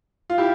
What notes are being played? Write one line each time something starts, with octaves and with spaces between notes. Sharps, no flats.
F4
E4 G4